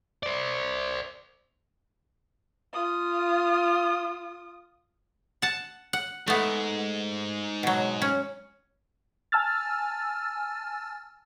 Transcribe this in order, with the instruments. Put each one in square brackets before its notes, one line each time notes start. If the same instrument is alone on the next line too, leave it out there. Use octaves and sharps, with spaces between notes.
[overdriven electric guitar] C5 D5
[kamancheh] F4 D#6
[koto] F#5 A5
F#5
[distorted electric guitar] G#2 [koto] A3 B3
[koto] B2 F#3
C#4
[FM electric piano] G#5 A5 E6 F6 A6